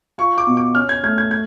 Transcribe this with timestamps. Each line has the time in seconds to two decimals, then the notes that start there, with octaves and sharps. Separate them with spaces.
0.18 F4 C#6
0.38 D6
0.47 B2
0.57 D6
0.75 C#4 F6
0.89 G#6
1.03 A3 G#6
1.18 G#6
1.31 G#6